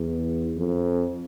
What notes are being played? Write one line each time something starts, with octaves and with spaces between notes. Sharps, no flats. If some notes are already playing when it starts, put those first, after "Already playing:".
Already playing: E2
F2